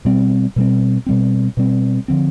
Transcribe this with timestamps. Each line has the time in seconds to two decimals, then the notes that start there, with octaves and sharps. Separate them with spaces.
0.05 B2 G3 C4
0.56 B2 G3 C4
1.06 B2 G3 C4
1.57 B2 G3 C4
2.08 D3 F3 C4